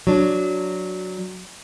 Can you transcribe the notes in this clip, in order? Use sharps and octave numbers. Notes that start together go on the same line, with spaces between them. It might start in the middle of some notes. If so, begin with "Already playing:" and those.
F#3 D4